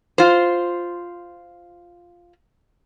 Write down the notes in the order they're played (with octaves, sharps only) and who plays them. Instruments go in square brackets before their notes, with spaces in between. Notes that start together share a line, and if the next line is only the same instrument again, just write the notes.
[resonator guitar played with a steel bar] F4 C5